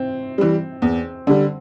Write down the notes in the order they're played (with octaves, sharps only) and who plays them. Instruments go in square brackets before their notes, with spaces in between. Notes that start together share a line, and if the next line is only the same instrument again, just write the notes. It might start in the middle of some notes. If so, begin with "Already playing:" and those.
Already playing: [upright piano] C4
[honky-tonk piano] E3 G3
E2
D3 G3